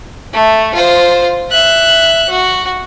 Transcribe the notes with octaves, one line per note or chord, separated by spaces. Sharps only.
A3
F4 C5
E5 F#6
F#4